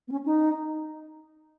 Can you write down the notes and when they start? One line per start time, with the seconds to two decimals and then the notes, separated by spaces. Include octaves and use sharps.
0.08 B3
0.12 C#4
0.26 D#4